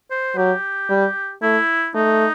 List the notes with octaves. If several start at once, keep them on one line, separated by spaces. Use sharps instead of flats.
C5
F#3 G4
G3
A3 E4
A3 D#4